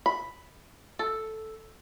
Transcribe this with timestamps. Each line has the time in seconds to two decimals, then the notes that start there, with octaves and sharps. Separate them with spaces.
0.06 B5
0.99 A4